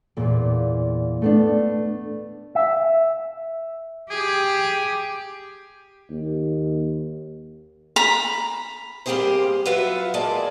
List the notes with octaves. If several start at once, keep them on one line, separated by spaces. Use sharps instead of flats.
E2 A#2 A#3
A3 B3 D4
E5
G4 G#4
D#2
A#5 B5
G3 A#3 C4 G4 G#4 C5
F#3 F4 B4 E5 F#5
G#3 A#3 D5 G#5 A5